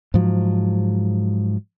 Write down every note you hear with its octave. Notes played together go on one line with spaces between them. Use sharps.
G#2 F3 F#3